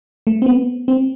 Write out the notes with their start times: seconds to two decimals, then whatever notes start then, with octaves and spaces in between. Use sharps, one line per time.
0.27 A3
0.42 C4
0.46 B3
0.88 C4